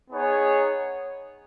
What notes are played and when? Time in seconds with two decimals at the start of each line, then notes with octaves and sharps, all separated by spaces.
0.10 B3 D#4 G#4 C#5